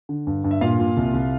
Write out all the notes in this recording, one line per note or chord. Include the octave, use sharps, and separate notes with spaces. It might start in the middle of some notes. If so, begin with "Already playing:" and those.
D3
G2
G2
E5
A#2 F4 F5
A#2
C2
C2